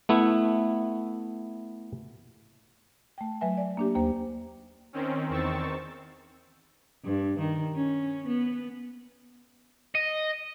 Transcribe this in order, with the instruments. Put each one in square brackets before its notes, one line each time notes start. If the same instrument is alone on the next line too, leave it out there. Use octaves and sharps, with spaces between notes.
[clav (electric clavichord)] A3 B3 E4
[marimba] A3 G5
F#3 B4 E5 G#5
D5
A#3 D4 G4
D#2 A#3 C5 G5
[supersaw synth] D#3 C4 C#4
E2 D#3 C4 C#6 E6 A6
[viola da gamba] G2
D#3
C#4
B3
[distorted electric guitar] D#5